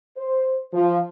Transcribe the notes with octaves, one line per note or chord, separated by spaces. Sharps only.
C5
F3